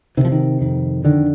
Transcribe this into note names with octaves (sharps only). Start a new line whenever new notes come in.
C3 D#3
F3
D#3
F2 D#3
D3 D#3